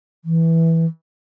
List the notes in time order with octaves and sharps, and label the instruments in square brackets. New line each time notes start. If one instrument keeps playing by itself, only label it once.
[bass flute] E3